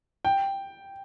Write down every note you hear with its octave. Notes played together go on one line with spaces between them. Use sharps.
G5